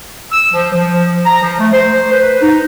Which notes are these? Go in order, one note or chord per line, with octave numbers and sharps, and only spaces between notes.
E6
F3
F3
A#5
F3
A3
C5
B4
D#4